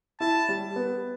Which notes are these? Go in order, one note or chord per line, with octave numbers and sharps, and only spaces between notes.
E4 A5
G3
B3